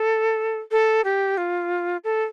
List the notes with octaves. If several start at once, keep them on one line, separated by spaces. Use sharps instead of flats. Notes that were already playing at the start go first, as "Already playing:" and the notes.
Already playing: A4
A4
G4
F4
A4